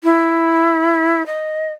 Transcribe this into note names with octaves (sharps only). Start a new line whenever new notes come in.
E4
D#5